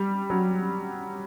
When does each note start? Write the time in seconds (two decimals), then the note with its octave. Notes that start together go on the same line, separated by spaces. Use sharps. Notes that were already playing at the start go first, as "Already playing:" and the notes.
Already playing: G3
0.30 F#3